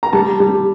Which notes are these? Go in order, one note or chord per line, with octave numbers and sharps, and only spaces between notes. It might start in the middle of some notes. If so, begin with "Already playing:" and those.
A#5
G3 A5
G3